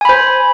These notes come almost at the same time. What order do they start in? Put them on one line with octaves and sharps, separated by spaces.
G#5 B5 C5